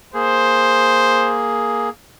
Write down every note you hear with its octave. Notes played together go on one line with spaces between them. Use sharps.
A#3 G#4 C5